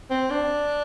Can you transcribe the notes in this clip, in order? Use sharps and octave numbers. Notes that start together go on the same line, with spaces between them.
C4
D4